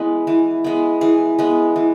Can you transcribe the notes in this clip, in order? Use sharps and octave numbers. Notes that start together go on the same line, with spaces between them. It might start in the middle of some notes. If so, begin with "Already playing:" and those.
Already playing: E3 G#3 B3
E3
G#3 B3
E3 G#4
G#3 B3
E3